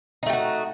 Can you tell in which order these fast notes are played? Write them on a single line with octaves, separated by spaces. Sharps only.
D#4 A3 G4 F#4